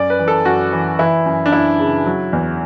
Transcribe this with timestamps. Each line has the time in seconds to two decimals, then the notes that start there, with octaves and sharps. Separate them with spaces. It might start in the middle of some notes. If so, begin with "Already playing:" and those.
Already playing: F#2 D5
0.10 B4
0.19 E3
0.28 A4
0.45 F#2 F#4
0.73 E3
0.99 E3 E4
1.26 F#2
1.46 D4
1.52 F#2 E4
1.79 C#3
2.06 F#3
2.33 E2